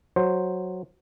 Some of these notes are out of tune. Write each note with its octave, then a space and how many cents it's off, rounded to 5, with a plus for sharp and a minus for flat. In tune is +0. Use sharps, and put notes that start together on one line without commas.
F#3 +0 C5 +5